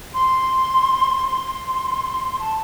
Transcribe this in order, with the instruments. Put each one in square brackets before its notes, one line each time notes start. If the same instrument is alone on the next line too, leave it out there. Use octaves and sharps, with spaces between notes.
[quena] C6
C6
A5